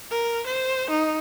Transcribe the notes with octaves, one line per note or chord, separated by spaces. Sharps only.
A#4
C5
D#4